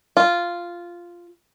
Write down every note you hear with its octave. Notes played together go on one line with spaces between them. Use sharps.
F4